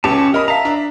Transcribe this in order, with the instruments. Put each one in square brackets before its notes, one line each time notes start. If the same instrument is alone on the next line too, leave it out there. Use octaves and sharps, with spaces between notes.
[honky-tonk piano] C#2 [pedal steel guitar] C#4 G4 A5
[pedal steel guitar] A#4 [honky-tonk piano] D#5 B5 D#6
[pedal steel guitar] E5 A#5 [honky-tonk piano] F5 A5
[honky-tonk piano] D4